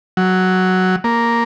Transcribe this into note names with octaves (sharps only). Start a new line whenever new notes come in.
F#3
A#3